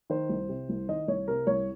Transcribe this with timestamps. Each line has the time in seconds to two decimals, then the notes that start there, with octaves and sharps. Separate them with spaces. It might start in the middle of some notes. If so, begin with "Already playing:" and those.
0.10 D#3 C5
0.29 C2
0.49 C3
0.69 C2
0.88 D#3 D#5
1.08 C2 C#5
1.28 C3 A#4
1.47 C2 C#5